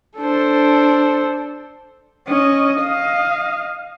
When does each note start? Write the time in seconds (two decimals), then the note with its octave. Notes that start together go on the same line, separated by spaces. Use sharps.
0.18 D4 A4 C5
2.27 C#4 D#5
2.80 D#5 F5